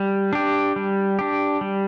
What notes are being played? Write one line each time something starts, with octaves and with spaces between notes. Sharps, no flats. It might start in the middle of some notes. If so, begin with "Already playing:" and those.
Already playing: G3
D4 G4
G3
D4 G4
G3